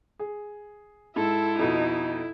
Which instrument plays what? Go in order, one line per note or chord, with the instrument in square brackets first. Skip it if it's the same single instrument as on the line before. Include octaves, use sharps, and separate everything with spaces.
[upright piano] G#4
[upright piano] G#2 [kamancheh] E4 [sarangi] A4
[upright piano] F2 B2 [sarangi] D#4